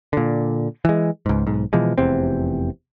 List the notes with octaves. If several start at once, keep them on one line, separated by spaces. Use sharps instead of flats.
A#2 D3
E3 G#3
C#2 G#2
B1 G#2
B2 E3 F3 G#3
F1 E2 C3 C4